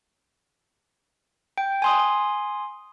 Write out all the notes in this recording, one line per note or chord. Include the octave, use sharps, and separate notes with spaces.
G5
G#5 C6 D#6